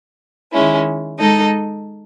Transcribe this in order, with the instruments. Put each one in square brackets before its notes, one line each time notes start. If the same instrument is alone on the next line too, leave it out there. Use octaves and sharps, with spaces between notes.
[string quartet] D#3 G#3 C#4 E4
G#3 D#4 A4 D#5